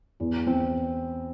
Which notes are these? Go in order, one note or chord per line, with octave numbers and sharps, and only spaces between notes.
E2
C4